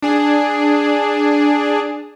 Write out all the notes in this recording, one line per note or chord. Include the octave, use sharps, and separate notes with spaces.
D4 G#4